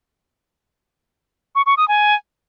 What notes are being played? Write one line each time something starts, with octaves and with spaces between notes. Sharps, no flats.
C#6
C#6
D#6
G#5